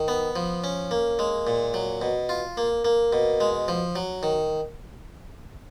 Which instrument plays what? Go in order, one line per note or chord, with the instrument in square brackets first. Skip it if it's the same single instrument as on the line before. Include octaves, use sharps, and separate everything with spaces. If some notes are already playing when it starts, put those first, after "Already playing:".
Already playing: [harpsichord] D#3
B3
F3
C#4
A#3
G#3
A#2
F#3
B2
F4
A#3
A#3
B2
G#3
F3
F#3
D#3